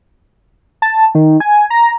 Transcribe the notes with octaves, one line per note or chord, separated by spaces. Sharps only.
A5
D#3
G#5
A#5